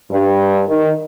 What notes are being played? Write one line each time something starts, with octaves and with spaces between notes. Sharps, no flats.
G2
D#3